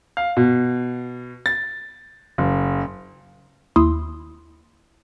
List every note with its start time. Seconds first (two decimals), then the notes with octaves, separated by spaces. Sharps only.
0.17 F5
0.37 B2
1.46 A6
2.38 F#1
3.76 D#2 E4 C6 D#6 E6